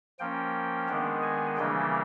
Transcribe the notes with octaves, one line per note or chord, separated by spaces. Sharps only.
F3 A#3 C#4 G5
D#3 G#3 B3 D4
G#5
C#3 E3 G3 A#3 D4 G5